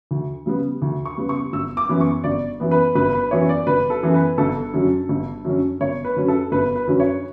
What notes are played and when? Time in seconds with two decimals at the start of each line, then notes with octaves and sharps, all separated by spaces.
0.11 D2
0.46 C#3 G3 B3
0.82 D2
1.05 C#6
1.18 C#3 G3 B3
1.29 C#6
1.53 G1 E6
1.77 D6
1.89 F#2 E3 B3
2.01 C#6
2.24 G1 D5
2.60 F#2 E3 B3
2.71 B4
2.95 G1 B4
3.13 B4
3.31 F#2 E3 B3 C#5
3.49 D5
3.67 G1 B4
3.90 A4
4.03 F#2 E3 B3
4.14 B4
4.38 G1 A4
4.73 F#2 D3 F#3 C#4
5.09 G1
5.45 F#2 D3 F#3 C#4
5.81 G1 C#5
6.05 B4
6.16 F#2 D3 F#3 C#4
6.28 A4
6.52 G1 B4
6.76 B4
6.87 F#2 D3 F#3 C#4
7.00 C#5